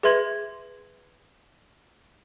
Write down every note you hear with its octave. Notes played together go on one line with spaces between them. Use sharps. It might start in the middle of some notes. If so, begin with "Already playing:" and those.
G#4 B4 E5 C6 G#6